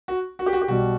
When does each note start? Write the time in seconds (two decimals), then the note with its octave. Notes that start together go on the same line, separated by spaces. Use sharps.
0.08 F#4
0.39 F#4
0.46 G4
0.53 F#4
0.61 G4
0.68 B1 B2 G3 F#4